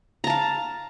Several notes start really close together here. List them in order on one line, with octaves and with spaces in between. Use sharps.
A#5 A5 F5